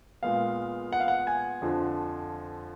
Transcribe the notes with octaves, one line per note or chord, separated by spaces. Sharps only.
A#2 G#3 B3 F5
F#5
F5
F#5
G#5
F2 D3 F3